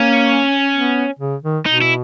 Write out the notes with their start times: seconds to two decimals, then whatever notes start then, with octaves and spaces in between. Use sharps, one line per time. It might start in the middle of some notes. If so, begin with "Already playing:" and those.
Already playing: A#3 C#4
0.73 B3
1.19 C#3
1.43 D#3
1.66 B2 D#4
1.82 E4